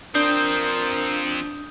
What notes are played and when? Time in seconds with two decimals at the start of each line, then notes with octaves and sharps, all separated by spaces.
0.15 F3 C4 D4 A#4 D#6 G6 G7